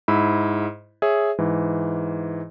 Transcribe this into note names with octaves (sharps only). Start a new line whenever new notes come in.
G#2 E4 B5 E6
G#4 C#5 E5
G#2 E3